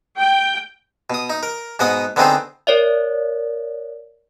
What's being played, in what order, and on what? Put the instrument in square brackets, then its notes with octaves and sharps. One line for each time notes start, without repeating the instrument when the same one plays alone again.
[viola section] G5
[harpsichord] B2 D#6
D#4
A#4
G#2 B2 B3 D#5 F#5 D#6
D3 B3 C4 D#4 G#4 C5
[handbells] A#4 C#5 D5 E5